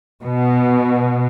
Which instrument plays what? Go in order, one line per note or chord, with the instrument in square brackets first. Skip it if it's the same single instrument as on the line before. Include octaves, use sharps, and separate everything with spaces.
[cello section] B2